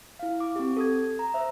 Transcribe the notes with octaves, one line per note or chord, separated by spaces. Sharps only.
E4 F5
D6
C4 G4
A4 D#6 G#6
A#5
C5 E5